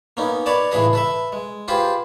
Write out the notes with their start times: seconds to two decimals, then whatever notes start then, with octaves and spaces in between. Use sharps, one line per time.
0.17 A#3 B3 C#4 D#4
0.46 B4 C#5 D5 A5
0.71 C#2 A2 E3 G#4 B4 D#5
0.93 A4 B4 E5
1.32 G#3
1.68 F4 G4 G#4 B4 C5